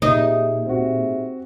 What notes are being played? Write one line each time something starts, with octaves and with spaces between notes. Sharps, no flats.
A#2 D#4 G4 G#4 E5
C4 F#4